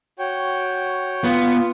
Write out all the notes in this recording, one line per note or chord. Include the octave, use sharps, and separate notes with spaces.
F#4 C#5 G5
B3 F4